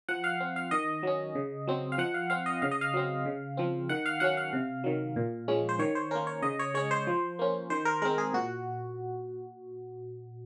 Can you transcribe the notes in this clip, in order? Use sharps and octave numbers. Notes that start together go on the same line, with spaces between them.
F3 F#5
F5
C4
F5
D#3 D#5
F#3 C#4
C#3
F#3 C4
F5
F3 F#5
F5
C4 F5
D#5
C#3 F5
D#5
F5
F#3 C4
C#3
F3 C4
D#3 F#5
F5
F#3 C#4 F#5
F5
C3
D#3 F#3
A#2
F3 G#3 C#4
C5
D#3 C#5
C5
A#3 C#4 A#4
C#5
C#3 D#5
C#5
G#3 C#4 C#5
C5
F3
A#3 C#4
D#3 C5
A#4
G#3 C4 A#4
G#4
A#2 F#4